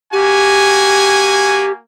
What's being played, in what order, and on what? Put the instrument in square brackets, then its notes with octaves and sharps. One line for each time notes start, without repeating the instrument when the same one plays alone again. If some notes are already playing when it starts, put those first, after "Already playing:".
[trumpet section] A#3 F#4 G#5 [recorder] G4